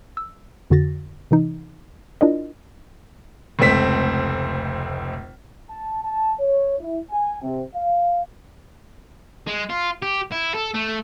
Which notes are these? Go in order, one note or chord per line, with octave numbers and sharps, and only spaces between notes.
E6
F2 D3 F#4 A6 A#6
C3 E3 D#4
D4 E4 F4 A#4 D5 D#5
F1 C#2 A3 C4 B6
A5
A5
C#5
E4
G#5
C3
F5
G#3
F4
G4
E4
A4
A3